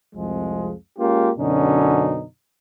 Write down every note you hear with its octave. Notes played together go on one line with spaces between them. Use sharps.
C2 F2 F3 G#3
G#3 A#3 C#4 F4 G4
F#2 B2 D3 C#4 D#4